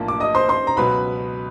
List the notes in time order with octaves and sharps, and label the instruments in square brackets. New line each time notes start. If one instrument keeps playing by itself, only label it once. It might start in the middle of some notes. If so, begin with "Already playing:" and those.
Already playing: [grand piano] B1 A2 F3 A#3 D4
[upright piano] D6
D#5 D#6
C5 C6
C5 C6
A#5
[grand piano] C#2 B2 F#3 [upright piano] B4 B5